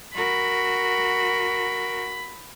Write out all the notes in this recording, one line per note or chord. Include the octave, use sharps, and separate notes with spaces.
F#4 A#4 B5